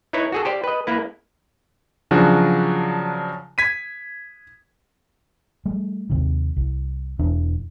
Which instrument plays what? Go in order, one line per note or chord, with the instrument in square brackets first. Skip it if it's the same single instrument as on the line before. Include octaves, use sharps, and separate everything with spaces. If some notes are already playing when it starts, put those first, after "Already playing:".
[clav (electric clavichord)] D#4 E4 B4 C#5
F#4 G#4 A4
G4 C5 D5
B4 D#5
A#3 E4 B4
[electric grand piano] C#3 F3 F#3 D4 F#4
G#6 B6 D#7
[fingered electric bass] G3 A3
D#2 C3 D#3
C2
E1 E2 E3 D4